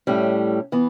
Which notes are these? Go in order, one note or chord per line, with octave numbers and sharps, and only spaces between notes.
A2 G3 C#4
E3 B3